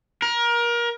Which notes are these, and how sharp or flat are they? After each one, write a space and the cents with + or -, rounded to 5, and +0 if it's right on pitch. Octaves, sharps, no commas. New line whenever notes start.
A#4 +25